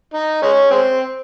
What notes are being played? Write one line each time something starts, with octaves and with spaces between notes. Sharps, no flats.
D#4
G#3 C#4
G#3 C4